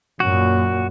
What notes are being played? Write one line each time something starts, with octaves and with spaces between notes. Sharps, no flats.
F#2 A#2 F#4